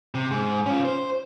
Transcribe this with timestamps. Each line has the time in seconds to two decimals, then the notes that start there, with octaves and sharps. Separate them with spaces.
0.15 C3
0.31 G#2
0.66 C#4 F4
0.85 C5